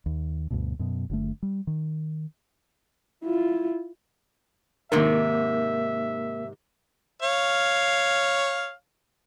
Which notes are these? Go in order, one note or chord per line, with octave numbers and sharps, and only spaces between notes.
D#2
D2 G2 B2
F#2 B2
F#1 D3 A3
G3
D#3
E4 F4
G#2 C3 D#3 A#3 A#4 E5
C#5 F5